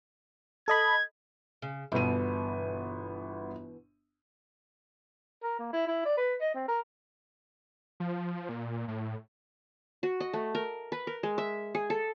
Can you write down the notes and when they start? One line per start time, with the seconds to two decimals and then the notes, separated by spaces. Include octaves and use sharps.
0.68 A4 D#5 B5 G#6
1.62 C#3
1.92 G1 B2 E3 B3 D#7
5.43 A#4
5.59 A#3
5.73 E4
5.87 E4
6.05 D5
6.17 B4
6.41 D#5
6.54 C4
6.68 A#4
8.00 F3
8.49 A#2
8.88 A2
10.03 F#4
10.20 D#5
10.33 A3
10.55 A#4
10.92 B4
11.07 A#4
11.23 G#3
11.38 E5
11.75 G#4
11.90 A4